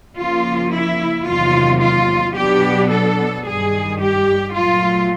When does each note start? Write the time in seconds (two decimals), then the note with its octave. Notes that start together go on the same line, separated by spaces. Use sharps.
0.17 C#3 F3 A#3 F4
0.72 E4
1.27 E2 C3 D#3 F#3 A#3 F4
1.81 F4
2.35 B2 F#3 B3 D4 G4
2.91 A4
3.45 G2 D#3 G3 G#4
4.00 G4
4.55 A#2 F#3 A3 F4